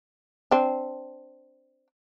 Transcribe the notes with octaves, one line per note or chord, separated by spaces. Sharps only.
C4 D4